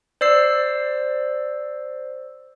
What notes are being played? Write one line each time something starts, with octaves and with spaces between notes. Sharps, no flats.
C5 D5 E6 C7